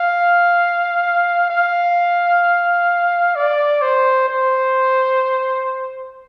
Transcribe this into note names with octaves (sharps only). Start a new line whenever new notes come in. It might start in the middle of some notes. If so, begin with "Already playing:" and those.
Already playing: F5
F5
D5
C5
C5